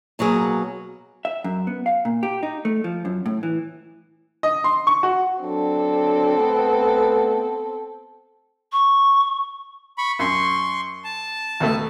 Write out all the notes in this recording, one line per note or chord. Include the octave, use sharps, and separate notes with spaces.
B2 F#3 A#3 G#4
E5
F#2
B3
F5
A#2
G4
D#4
A3
F3
F#2
A2
E3
D#5
C6
C#6
F#4
F#3 C4 D4 A4
A3 B3
C#6
B5 C#6
F#2 C6 C#6
A5
D#2 B2 A3